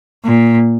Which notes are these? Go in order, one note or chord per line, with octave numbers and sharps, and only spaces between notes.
A#2